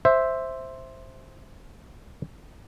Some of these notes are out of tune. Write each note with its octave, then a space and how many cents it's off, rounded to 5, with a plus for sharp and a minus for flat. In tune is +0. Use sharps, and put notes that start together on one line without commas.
C5 +5 E5 +0